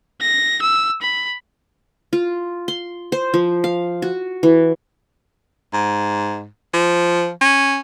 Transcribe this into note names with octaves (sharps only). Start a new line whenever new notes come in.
A#6
E6
B5
F4
C6
C5
F3
F5
F#4
E3
G#2
F3
C#4